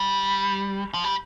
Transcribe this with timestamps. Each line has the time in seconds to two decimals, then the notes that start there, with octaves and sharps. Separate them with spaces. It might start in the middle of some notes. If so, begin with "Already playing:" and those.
Already playing: G3
0.94 F3
1.04 G3